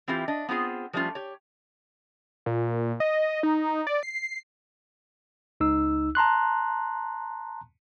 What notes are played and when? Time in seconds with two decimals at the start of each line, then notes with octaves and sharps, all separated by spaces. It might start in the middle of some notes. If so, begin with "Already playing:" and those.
0.08 E3 C4 E4 F4 G4
0.28 D4 D#5
0.49 B3 C4 F4 G#4
0.93 F3 G3 A3 C#4 F4
1.15 G4 C#5
2.46 A#2
3.00 D#5
3.43 D#4
3.87 D5
4.03 C7
5.60 C#2 D#4 E6
6.15 A5 A#5 C6 F#6